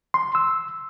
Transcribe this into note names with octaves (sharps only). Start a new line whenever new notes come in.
C6
E6